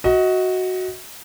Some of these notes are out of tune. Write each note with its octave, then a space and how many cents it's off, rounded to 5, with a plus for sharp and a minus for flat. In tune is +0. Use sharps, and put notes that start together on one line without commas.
F#4 +0 D#5 +30